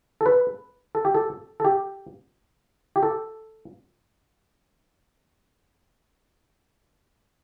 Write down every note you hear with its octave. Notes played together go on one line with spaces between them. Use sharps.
A4
B4
A4
G4
A4
A4
G4
G4
A4